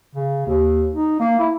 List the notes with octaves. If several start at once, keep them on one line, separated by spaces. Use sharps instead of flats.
C#3
D#2
D#4
A#3
E4